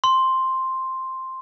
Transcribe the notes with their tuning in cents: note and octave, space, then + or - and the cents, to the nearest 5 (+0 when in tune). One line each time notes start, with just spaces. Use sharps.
C6 +0